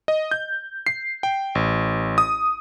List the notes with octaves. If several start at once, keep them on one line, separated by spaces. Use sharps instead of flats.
D#5
G6
C7
G5
A1
D#6